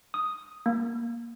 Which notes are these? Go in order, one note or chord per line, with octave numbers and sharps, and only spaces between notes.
D#6
A#3